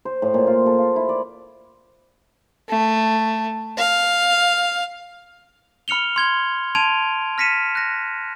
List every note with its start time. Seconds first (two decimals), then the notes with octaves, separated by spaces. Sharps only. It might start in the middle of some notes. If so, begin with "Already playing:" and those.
0.05 C5
0.22 A2
0.34 A#2
0.47 F4
0.66 A4
0.78 F5
0.96 E4
1.09 D5
2.69 A3
3.78 F5
5.88 B5 F6 C#7 F7 G7
6.16 C6 G#6 G7
6.75 A5 C6 G#6 D7 D#7 F7
7.38 F6 A#6 B6 C#7 D#7 E7
7.75 F#6 A#6